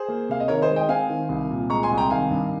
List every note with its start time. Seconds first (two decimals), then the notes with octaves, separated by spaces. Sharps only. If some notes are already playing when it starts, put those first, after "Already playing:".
Already playing: G#4 C5
0.08 A#3
0.29 C3 F5
0.40 D#5
0.48 D#3 A#4 C#5
0.62 C5 D#5
0.70 G#3
0.76 D#5 G5
0.89 C4 F5 G#5
1.10 D#3
1.29 C2
1.50 A#2
1.70 G#3 A#5 C#6
1.83 G#5 C6
1.91 C2
1.97 G5 A#5
2.10 D#3 F5 G#5
2.30 G2